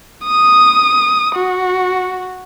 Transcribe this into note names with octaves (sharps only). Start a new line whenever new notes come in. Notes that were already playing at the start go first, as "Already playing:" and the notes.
D#6
F#4